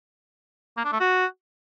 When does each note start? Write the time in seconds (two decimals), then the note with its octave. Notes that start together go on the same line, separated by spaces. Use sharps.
0.77 A#3
0.85 D4
0.93 A3
1.00 F#4